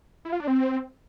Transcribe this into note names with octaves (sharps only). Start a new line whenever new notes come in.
E4
F4
D4
C4